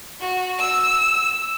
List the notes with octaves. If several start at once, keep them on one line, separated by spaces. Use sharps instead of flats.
F#4
E6